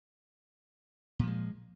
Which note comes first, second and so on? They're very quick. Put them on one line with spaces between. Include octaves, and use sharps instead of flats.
A#2 F3 G#3